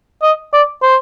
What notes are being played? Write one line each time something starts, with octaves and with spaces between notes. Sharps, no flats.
D#5
D5
C5